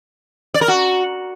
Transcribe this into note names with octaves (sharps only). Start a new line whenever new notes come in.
D5
A#4
F#4